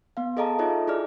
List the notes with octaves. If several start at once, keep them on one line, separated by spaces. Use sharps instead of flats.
B3 F5
G#4 A4 D#5 F5 A5 A#5
D#4 F4 A4 C#5 D#5 E5
E4 G#4 D5 F6